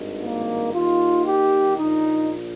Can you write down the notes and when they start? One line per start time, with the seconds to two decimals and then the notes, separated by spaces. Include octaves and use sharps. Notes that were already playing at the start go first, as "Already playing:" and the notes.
Already playing: G#1 G2 D#3
0.21 A#3
0.73 D#2 D#3 F4
1.25 G4
1.76 A#1 A#2 D#4